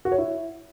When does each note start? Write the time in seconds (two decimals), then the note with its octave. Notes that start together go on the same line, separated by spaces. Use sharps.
0.05 F#4
0.12 C#5
0.18 E4